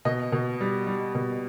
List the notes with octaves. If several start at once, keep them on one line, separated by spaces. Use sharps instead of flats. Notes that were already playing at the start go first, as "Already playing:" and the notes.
B2 D#5
B2
G3
G3
B2